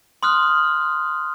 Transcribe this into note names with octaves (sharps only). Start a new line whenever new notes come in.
C6 D#6 F6 F#6